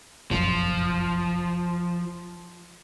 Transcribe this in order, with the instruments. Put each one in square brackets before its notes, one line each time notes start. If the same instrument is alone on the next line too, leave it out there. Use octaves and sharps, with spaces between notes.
[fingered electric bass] F1 A#1 F#2 [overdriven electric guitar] F3